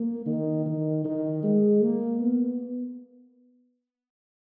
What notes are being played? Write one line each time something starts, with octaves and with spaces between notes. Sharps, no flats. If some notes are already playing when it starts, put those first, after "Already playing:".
Already playing: A#3
D#3
D#3
D#3
G#3
A#3
B3